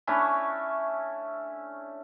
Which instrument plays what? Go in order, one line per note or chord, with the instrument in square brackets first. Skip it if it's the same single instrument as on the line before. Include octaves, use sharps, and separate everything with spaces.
[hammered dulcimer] A3 C#4 D4 E4